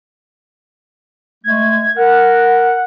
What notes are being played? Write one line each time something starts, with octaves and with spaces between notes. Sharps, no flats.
G#3 A3 G#6
A#4 F#5